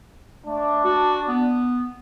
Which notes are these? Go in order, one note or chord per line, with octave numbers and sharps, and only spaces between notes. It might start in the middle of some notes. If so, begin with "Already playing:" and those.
A3 D4
F#4
B3